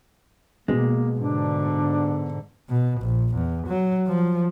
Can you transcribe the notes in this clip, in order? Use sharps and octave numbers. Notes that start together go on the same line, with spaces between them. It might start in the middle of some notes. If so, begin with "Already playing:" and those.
B2 G#3 A#3
G#2 D3 D4
B2
A#1
E2
F#3
F3